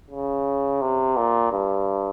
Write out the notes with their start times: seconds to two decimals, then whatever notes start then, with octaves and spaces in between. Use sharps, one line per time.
0.11 C#3
0.81 C3
1.17 A#2
1.51 G2